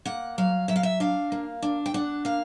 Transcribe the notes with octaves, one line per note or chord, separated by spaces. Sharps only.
A#3 F#5
F#3 F5
F#3 E5
F5
E5
D4 F5
A#3
D4
G5
D4 F#5
A#3 F5